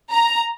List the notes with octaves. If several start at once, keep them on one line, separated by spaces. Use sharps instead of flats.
A#5